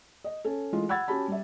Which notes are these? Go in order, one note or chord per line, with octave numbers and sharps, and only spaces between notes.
D#5
C#4 A4
E3 G#3 A3 F4
F#5 B5 E6 G#6 A6
C#4 F#4 G4 A5 B5
G3 E5